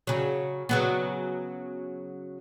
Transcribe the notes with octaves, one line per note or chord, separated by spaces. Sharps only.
C#3 F#3
C#3 F#3 B3